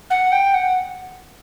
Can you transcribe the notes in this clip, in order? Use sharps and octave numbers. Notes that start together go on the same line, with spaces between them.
F#5
G5
F#5